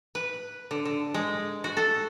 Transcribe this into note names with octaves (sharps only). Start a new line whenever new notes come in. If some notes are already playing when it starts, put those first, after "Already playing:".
B4
D3
D3
G#3
F#4
A4